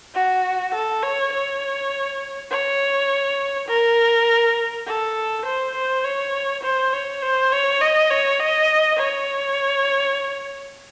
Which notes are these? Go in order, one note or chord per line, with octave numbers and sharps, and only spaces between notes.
F#4
A4
C#5
C#5
C#5
A#4
A4
C5
C5
C#5
C5
C#5
C5
C#5
D#5
C#5
D#5
C#5